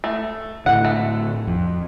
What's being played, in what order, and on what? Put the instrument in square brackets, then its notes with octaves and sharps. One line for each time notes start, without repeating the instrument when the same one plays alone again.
[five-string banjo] A3
[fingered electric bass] A2 D3 [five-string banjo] F#5
[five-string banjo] A3
[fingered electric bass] F2